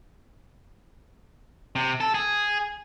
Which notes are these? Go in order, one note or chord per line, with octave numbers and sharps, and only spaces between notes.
C3
A4
G#4